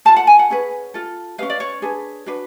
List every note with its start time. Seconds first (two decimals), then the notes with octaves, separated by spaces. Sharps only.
0.05 F4 A4 A5
0.16 F#5
0.27 G#5
0.39 F#5
0.50 C#4 G#4 B4
0.94 F4 A4
1.38 C#4 G#4 B4 F5
1.50 D5
1.60 C#5
1.82 D4 G#4 B4
2.26 D4 F#4 B4